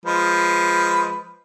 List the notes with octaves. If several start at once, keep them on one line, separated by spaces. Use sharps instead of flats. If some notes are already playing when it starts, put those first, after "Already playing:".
F3 G#3 B4